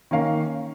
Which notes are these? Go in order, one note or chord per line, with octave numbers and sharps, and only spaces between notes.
D#3 A#3 C#4 A#4 F5